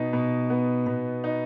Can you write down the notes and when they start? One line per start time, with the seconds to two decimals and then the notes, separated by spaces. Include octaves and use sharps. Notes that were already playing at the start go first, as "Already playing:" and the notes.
Already playing: B2 B3 D#4
0.13 B2
0.50 B3
0.86 B2
1.24 D#4